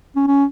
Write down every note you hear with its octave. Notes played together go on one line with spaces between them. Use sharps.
C#4
C#4